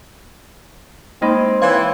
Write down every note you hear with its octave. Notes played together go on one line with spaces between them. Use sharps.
G#3 A#3 C4 D#4 D#5 B5
E3 C#5 F5 C6 G#6